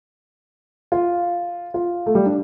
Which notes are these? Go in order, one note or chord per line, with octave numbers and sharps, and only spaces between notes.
F4
F4
A3
G3
D4